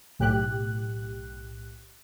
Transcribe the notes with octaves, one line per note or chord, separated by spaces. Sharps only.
B1 A2 G4 F#6